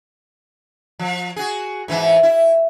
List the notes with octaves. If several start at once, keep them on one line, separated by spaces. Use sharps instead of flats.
F3
F#4 G#4
G#2 E3 E4
E4